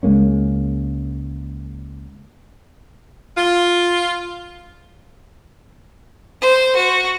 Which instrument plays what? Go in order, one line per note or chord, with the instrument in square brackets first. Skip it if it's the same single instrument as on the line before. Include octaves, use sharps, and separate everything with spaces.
[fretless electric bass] C#2 G#3 A#3 C#4
[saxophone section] F4
[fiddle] C5
F#4